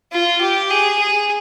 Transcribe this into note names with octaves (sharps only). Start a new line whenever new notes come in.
F4
G4
G#4
G#4